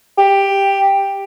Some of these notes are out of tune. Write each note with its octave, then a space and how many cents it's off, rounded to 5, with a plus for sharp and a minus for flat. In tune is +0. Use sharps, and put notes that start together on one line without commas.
G4 +10